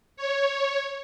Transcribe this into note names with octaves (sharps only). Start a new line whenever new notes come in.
C#5